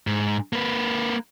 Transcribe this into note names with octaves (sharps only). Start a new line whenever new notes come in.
G#2
A#3 B4